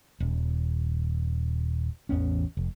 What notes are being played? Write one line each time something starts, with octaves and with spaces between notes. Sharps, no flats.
D#1
A1 E2 B3 C#4
F1